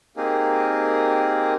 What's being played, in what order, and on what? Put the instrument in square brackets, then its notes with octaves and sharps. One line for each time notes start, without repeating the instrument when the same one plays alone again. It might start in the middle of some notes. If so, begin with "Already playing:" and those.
[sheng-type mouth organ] A#3 C4 D#4 G4 G#4 A#4